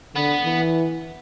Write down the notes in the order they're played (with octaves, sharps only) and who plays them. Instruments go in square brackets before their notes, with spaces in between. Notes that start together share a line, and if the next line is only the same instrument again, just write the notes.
[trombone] D3 [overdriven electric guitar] B3
[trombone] E3